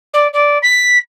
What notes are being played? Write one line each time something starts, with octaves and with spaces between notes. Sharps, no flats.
D5
D5
B6